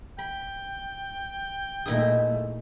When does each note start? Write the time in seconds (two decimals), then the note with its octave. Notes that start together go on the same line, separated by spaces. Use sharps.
0.19 G5 B5
1.86 A#2 A3 D#4 E4 G#4